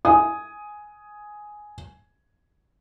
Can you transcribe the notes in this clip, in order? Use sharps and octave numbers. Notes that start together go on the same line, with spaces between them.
G#5 D#6